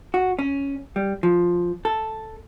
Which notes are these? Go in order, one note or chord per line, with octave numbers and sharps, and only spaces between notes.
F#4
C#4
G3
F3
A4